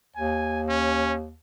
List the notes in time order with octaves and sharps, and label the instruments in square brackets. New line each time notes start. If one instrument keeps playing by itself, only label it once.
[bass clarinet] D#2 [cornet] G#5
[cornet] C#4